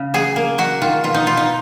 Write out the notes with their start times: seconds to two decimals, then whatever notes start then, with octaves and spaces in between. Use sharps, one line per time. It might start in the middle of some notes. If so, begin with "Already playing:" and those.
Already playing: C#3
0.14 F#3 G#4
0.36 A#3
0.58 F#3 F#4
0.82 D#3 F4
1.04 B2 F4
1.14 D#4
1.26 B3 F4
1.37 D#4